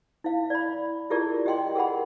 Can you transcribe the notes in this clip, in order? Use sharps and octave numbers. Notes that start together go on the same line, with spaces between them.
E4 F5
D5 B5
E4 F4 G4 G#4 A#4 D5
G4 D#5 G5 C6
G#4 A#4 F#5 B5